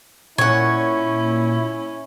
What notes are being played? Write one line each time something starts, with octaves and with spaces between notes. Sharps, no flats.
A#2 C#4 E4 C#5 F#5